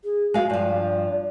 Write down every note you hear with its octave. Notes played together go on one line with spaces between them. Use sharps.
G#4
G#3 F#4 F5
G2 F3 D5